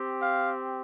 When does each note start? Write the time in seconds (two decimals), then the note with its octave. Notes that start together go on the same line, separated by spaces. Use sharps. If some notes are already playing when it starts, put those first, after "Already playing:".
Already playing: C4 G4
0.22 F5